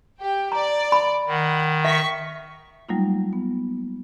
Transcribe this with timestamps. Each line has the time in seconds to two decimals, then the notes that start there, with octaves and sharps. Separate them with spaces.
0.21 G4 G5
0.52 D5 A#5
0.92 B5
1.28 D#3 F#5
1.85 E5 C#6 B6
2.89 F#3 G3 A3 A#3 D#4 F4
3.33 B3